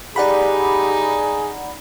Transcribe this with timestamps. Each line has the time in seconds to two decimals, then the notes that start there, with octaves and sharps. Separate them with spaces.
0.16 D#4 G4 G#4 D5 F#5 B5